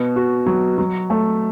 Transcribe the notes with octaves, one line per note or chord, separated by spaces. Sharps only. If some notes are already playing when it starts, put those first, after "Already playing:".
Already playing: B2 B3
F#4
F#3
F#3
A3